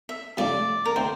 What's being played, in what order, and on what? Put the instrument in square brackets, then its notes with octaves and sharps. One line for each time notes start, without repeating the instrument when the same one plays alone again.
[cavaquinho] E5
[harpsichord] C3 F3 A3 D4 [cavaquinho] D5
[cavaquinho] A#4
[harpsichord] D3 A3 C4 [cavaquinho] C5